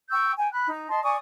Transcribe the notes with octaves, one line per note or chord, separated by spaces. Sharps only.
G5 C#6 E6 G6
G5 G#5
B5 F#6
D#4
D#5 A5 C6
D5 G#5 C#6 D#6